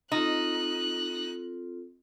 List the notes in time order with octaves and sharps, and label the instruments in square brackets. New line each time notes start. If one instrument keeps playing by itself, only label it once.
[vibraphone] C4 F4 A4 [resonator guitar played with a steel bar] D#4 [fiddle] F#6